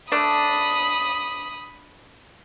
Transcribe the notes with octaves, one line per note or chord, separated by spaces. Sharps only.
A3 D4 B5 D#6